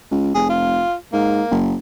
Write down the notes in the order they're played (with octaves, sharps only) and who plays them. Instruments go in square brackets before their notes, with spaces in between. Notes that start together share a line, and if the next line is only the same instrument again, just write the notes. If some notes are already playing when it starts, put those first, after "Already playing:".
[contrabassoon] C#2
[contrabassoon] F1 [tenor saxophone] G#4
[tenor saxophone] F4
[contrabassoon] G#2 [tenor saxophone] A#3
[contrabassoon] F#1